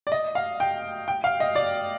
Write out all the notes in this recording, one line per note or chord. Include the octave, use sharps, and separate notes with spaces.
D5
D#5
F5
G5
G5
F5
D#5
D5